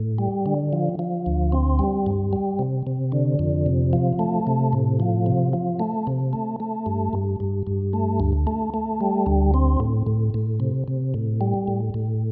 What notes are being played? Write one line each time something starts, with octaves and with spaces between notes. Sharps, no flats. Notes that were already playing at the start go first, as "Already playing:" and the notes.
Already playing: A2
G3
D3
F3
F3
D2
C4
G3
G2
G3
C3
C3
D3
F2
C3
F3
A3
C3
A2
F3
C3
F3
A3
C3
A3
A3
G2
G2
G2
G2
A3
D2
A3
A3
G3
D2
C4
A2
A2
A2
C3
C3
A2
G3
A2
A2